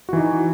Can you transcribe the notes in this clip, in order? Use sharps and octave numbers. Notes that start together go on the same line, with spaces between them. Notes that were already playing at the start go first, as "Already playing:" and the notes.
E3 D#4 F#4